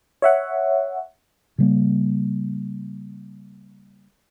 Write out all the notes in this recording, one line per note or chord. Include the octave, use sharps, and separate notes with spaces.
C#5 E5 F#5
C#3 G3 A#3